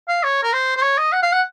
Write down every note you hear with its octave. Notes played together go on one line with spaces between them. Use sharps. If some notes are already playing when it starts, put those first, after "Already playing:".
F5
C#5
A#4
C5
C5
C#5
D#5
F#5
F5
F#5